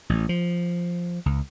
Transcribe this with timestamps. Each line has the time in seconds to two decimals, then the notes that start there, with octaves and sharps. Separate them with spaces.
0.09 A1
0.29 F3
1.26 C#2